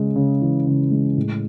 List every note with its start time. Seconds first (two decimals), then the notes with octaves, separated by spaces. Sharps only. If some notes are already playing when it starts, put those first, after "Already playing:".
Already playing: C#3 G#3
0.16 C#3
0.41 E3
0.67 C#3
0.91 G#3
1.17 A2